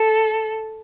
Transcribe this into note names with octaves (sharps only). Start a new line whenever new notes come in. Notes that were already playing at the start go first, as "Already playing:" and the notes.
Already playing: A4